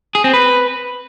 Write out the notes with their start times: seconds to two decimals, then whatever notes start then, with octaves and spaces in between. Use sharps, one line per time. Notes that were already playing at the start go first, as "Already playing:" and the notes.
0.15 G#4
0.24 C4
0.34 B4